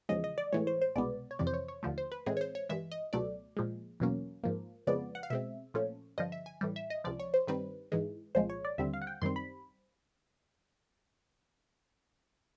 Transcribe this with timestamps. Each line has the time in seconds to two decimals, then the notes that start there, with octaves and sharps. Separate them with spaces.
0.09 E2 C#3 F3 G#3 D#5
0.24 D#5
0.38 D5
0.53 A2 E3 G#3 C#5
0.67 C5
0.82 C5
0.95 C2 B2 G#3 B3 D5
1.31 C#5
1.39 F2 C3 E3 D5
1.47 C5
1.54 C#5
1.68 C#5
1.83 D#2 D3 F3 A3
1.98 C5
2.12 B4
2.26 A2 E3 G#3 C4 G#4
2.37 C#5
2.41 C5
2.55 C#5
2.69 G2 E3 G#3 E5
2.92 D#5
3.13 C#2 B2 F#3 A3 D5
3.57 A#2 F3 G#3
4.00 E2 B2 F#3 A#3 C#4
4.44 G#2 F3 A#3
4.87 F2 C#3 F3 G#3 B3 D5
5.15 F#5
5.23 F5
5.30 B2 G#3 C4 E5
5.74 A#2 F3 A3 C#4
6.18 G2 D3 F3 D#5
6.32 E5
6.46 G#5
6.61 A2 E3 G3
6.76 E5
6.90 D#5
7.04 C#2 C3 F3 D5
7.20 C#5
7.34 C5
7.47 G2 D#3 G3 C4 B4
7.92 G#2 E3 G#3
8.35 C2 A#2 F3 G#3 C5
8.50 C#5
8.65 D5
8.78 D#2 D3 G3 C4 E5
8.94 F5
9.02 F#5
9.07 G5
9.22 F#2 D#3 G3 C4 C6
9.36 B5